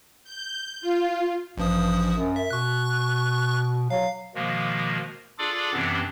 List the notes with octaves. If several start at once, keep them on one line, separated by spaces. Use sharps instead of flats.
G6
F4
A1 G2 F3 D#6
F#2
E5
B2 C#6 F#6
F#3 F5
B2 D#3 F3 G#3 A#3
D4 F4 G#4 A4 D5 D6
F#2 C3 E3 B3 C4 D4